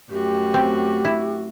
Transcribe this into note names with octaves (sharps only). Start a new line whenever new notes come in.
F#2 A3 F#4 G4
C4
E4